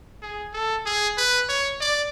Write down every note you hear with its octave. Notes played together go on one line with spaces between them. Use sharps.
G#4
A4
G#4
B4
C#5
D5